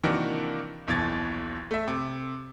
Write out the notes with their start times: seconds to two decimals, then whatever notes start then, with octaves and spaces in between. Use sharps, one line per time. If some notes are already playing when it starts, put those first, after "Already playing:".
0.03 C3 D#3 E3 A#3 D4 F#4
0.87 D#1 B1 B2 E3 G#6 A6
1.71 A3 E5
1.88 C3